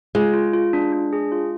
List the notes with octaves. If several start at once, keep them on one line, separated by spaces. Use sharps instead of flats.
G#3 F4
F4
F4
D4
D4
G#4
F4